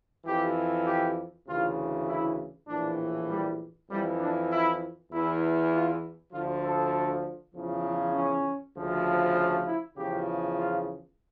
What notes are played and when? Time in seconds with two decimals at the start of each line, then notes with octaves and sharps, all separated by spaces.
0.25 F2 E3 G4
0.86 G4
1.46 D2 C#3 E3 F4
2.07 E4
2.67 A#1 A2 E3 D4
3.29 G3
3.89 F2 E3 G3
4.19 D4
4.50 E4
5.11 E2 E3 E4
5.71 F4
6.32 D2 D3 F3 F4
6.62 A4
7.54 E2 C#3 F3
8.14 C#4
8.76 D2 C#3 F3
9.66 E4
9.96 E2 C#3 F3 G4
10.57 F4